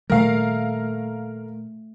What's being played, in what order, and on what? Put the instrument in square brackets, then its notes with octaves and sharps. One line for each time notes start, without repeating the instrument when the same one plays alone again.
[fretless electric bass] A#2 D#3 G3 [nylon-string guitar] A3 [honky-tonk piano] A#4 F5